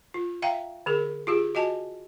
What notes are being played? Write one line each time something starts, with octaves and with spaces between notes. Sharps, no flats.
F4
E5 F5 G5 A#5
D3 G#4 A#4
F4 G4 G#4
F#4 D#5 G#5 A5